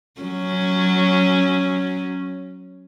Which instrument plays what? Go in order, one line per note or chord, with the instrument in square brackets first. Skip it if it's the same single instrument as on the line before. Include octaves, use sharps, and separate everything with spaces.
[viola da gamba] F#3 C#4